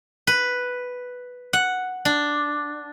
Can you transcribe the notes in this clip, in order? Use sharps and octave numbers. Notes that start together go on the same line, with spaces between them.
B4
F#5
D4